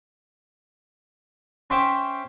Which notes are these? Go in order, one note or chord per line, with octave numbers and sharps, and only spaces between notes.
C#4 C5 E5 G5 D6